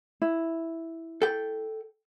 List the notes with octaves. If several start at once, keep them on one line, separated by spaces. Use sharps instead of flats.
E4
A4 G5